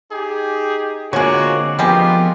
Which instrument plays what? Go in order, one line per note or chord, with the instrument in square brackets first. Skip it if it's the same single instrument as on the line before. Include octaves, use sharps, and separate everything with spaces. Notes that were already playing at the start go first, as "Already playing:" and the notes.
[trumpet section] D#4 G4 G#4
[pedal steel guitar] D3 C4 D5 [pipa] G#3 C#5 [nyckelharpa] A#3 [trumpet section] F4 F#4
[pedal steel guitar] F3 C4 [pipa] G3 G#3 G4 [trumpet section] B3 [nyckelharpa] F4 A#4